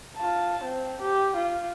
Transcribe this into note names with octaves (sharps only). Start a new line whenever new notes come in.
F4 A5
C4
G4
F4